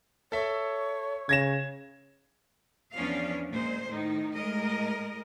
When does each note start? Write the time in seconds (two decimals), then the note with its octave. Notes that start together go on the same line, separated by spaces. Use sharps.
0.32 A4 C#5 E5
1.29 C#3 G#6 A#6 E7
2.95 E2 F3 B3 C#4 D4 F5
3.50 A#2 G#3 C5
3.90 A2 D#3 D#4
4.34 A2 G#3 A#4 D#5